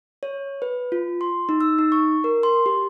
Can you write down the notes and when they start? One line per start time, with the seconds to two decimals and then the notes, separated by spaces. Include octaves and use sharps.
0.23 C#5
0.62 B4
0.92 F4
1.21 C6
1.49 D#4
1.61 E6
1.79 D#4
1.92 C#6
2.24 A#4
2.43 C6
2.66 G4